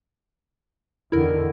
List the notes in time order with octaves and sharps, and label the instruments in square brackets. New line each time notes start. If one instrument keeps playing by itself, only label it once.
[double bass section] E2 D3 D#3 [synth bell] E4 A#4